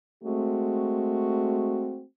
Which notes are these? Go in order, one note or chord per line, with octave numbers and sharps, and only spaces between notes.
G#3 A3 C4 F#4